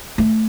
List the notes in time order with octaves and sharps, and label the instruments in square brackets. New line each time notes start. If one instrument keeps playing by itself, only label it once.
[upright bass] A3